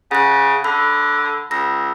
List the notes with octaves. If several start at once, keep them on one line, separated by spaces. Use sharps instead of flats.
C#3 F#5 F#6
D3 B5
C#2 E6 A#6